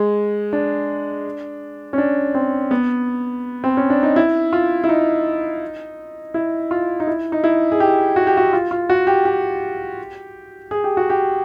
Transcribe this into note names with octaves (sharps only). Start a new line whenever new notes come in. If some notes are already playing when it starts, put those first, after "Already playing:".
Already playing: G#3
D4
C#4
D4
C4
B3
C4
C#4
D4
D#4
E4
F4
E4
D#4
E4
F4
D#4
E4
D#4
E4
G#4
G4
F#4
G4
F#4
F4
F4
F#4
G4
G4
G#4
G4
F#4
G4